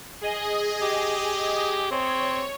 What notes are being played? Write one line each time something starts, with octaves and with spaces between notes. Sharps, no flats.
G#4 D#5
G4
C4 C#5